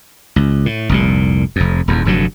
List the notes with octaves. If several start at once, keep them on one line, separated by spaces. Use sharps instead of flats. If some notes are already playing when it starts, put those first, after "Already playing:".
C#2
A2
F1 C2 A#2
F1 F2
D#1 E2
F1 G2 D3 F#3